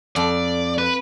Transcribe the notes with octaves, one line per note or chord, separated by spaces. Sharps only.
F2 D5
B4